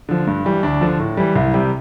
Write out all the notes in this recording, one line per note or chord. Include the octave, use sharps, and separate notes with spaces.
D3 F3
G2
E3 G3
D2 D4
D3 F3
A2
E3 G3
C2 E4
C3 G3